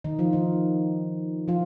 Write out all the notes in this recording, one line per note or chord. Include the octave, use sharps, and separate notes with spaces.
D#3 D#4
F3 F4
D#3 D#4
F3 F4